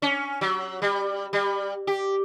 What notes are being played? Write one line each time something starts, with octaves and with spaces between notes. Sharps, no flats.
C#4
F#3
G3
G3
G4